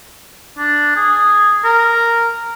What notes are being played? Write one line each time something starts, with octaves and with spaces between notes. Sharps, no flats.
D4
G#4
A#4